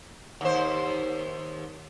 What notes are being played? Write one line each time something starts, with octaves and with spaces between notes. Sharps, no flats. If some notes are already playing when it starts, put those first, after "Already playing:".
D#2 C5